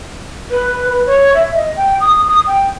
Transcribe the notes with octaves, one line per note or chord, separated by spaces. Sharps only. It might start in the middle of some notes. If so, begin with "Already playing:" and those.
B4
B4
C#5
E5
D#5
G5
D#6
D#6
G5